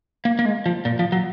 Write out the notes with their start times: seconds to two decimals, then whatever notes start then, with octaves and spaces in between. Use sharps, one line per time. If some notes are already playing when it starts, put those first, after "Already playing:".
0.25 A#3
0.39 A#3
0.45 G#3
0.66 F3
0.85 A#2
0.99 F3
1.12 F#3